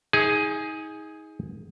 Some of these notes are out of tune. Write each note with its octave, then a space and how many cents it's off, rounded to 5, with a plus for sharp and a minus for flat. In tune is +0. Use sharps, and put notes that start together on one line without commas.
D#4 +35 G#4 +0